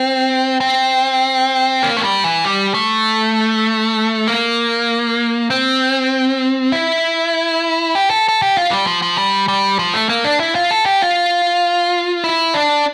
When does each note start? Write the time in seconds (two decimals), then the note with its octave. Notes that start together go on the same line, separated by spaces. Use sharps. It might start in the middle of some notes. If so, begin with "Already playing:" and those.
Already playing: C4
0.60 C4
1.83 A#3
1.97 A3
2.03 G3
2.24 E3
2.45 G3
2.74 A3
4.27 A#3
5.50 C4
6.72 E4
7.95 G4
8.10 A4
8.29 A4
8.42 G4
8.56 F4
8.71 G3
8.87 F3
9.02 F3
9.18 G3
9.48 G3
9.79 F3
9.94 A3
10.09 A#3
10.25 D4
10.40 E4
10.55 F4
10.71 A4
10.86 G4
11.02 F4
12.24 E4
12.54 D4